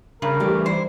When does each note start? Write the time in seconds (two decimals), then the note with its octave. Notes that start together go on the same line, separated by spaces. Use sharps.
0.22 G2 C#3 A#4
0.40 E3 G3 A3 G4
0.66 G3 E4 C5